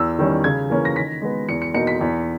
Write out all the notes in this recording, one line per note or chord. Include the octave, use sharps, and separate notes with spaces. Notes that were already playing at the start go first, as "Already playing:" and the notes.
Already playing: E2 E6
D#3 G3 C#4
C#3 G#6
E3 A#3 C#4
A#6
D#3 B6
G#3 B3
E2 C#7
C#7
B2 A#3 D#4 C#7
B6
E2